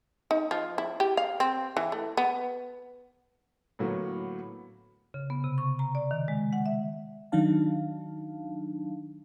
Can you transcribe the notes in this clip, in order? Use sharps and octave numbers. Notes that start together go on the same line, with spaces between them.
D#4
F3
E4
G4
F5
C4
E3
A3
B3
A2 D3 F#3 A#3 B3
C#3
B3
C3
C#6
A#5
D5
D#3
G#3
F#5
E5
D#3 F#3 D4 D#4 F5 A5